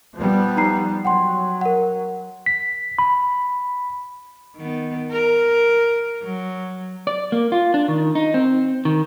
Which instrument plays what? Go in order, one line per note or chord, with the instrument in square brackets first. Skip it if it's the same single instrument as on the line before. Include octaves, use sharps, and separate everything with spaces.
[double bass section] F3 G3 B3
[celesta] D#4 A#5 C7
[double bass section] F#3 [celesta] F#5 G5 C6
[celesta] A#4 F#5
[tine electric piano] B6
B5
[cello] D#3 B3
A#4
F#3
[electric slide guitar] D5
A#3
F4
D4
D#3
D#4
C4
D#3